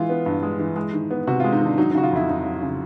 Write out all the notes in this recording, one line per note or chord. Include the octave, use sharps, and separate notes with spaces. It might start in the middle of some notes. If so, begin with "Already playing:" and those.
Already playing: E3 G#3 F4
B3
G2
G#3
E3
G#3
D#3
B3
C3 F#4
F4
G#3
D#4
D#3 D4
F#3 D#4
D#4
C#3 F#4
F4
F2 E4
F2 D#4
F#3
C#3